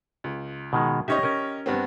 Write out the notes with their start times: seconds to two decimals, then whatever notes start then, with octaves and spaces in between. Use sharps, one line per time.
0.24 C#2
0.73 B2 D#3 G#3
1.08 C#4 D#4 G4 C#5 D#5 E5
1.23 C#4 A#4
1.66 G2 B3 C4